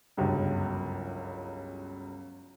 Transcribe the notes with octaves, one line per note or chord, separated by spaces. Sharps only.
G1 C#2 F#2